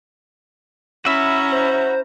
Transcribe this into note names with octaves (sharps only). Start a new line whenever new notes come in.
C#4 E4 F#4 E5 A#5 B5
C5